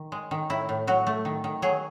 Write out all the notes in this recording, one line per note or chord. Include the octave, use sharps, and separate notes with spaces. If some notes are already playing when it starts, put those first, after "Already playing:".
Already playing: D#3
G#3
D#3
A2 E4
A2
F#3 F#4
A3
D#3
D#3
F#3 G#4